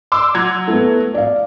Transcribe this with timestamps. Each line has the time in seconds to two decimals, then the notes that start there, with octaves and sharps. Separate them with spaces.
0.12 C6 D6 E6
0.35 F#3 G#6
0.68 A3 B3
1.14 D5 F5